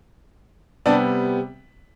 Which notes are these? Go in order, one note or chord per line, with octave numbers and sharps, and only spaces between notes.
C3 G3 B3 D4